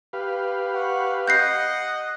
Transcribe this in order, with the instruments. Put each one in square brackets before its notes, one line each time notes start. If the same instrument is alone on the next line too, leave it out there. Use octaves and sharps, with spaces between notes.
[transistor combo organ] G4 B4 F5
[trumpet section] F#5 C#6
[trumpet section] D#5 [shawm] F#5 [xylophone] G6 A#6 C7